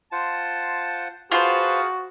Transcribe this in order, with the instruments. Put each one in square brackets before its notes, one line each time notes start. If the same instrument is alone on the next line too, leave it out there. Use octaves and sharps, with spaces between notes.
[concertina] F4 C5 F#5 [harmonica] A5
[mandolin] F4 C5 [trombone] F#4 [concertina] G#4 F5 [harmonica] B4 F#5 A5